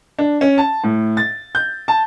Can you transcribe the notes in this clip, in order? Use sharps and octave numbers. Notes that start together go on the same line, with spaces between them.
D4
C#4
A5
A2
A6
G6
A5